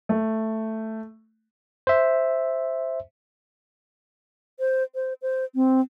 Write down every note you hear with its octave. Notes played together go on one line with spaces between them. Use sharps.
A3
C5 E5
C5
C5
C5
C4